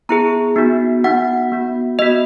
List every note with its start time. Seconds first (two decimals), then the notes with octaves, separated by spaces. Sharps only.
0.09 B3 E4 G#4 A#5
0.56 B3 D#4 F#4
1.04 B3 D#4 F#4 F#5
1.52 B3 F#4
1.99 B3 F#4 D#5